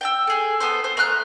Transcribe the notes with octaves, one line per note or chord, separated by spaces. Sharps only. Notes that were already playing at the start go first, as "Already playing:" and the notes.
G5 A5 E6
G#4 A4
B3 A4 C5
C5
A3 A#5 F6 F#6